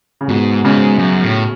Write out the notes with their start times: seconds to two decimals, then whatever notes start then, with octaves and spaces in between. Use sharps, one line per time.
0.21 C#3
0.29 G#2 B2
0.64 G#2 C#3
0.99 F#2
1.23 A2